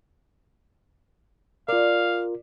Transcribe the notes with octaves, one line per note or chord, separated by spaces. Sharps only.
F4 A#4 D5 F5